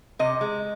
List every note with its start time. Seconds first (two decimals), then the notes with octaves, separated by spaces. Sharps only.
0.19 C3 D#5
0.41 G#3